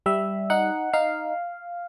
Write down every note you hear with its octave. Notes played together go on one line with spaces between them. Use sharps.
G3 E5
D#4 F#5
D#4 F5